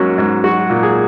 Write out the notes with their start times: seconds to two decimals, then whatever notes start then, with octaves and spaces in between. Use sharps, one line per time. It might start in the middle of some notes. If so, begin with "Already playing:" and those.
Already playing: G#2 F#3 A#3 C#4
0.18 G#2
0.44 F#3 F#4
0.70 A#2
0.83 G#4